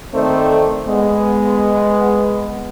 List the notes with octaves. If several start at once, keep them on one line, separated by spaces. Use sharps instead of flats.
D#3 A3 C4 A4 C5 D5
G#3 B3